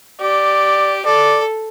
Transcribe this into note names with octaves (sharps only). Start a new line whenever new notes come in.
G4 D5
A4 D5